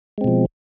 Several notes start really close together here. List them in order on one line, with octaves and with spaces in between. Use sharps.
G#3 C4 B2 F3